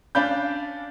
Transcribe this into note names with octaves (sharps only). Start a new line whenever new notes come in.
C#4 D4 D5 F5 B5 G6